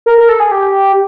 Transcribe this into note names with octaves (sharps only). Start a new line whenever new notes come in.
A#4
A#4
A4
G#4
G4